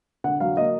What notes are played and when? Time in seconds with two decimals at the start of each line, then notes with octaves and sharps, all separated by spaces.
0.24 D3 F#5
0.40 F#3 F5
0.57 A#3 D#5